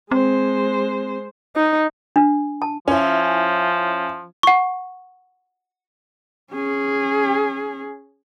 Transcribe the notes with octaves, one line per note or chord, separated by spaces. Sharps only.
G#3 C4 C5
D#4
D4
A5
F3 C#4 E4
F#5 C#6
C#4 G#4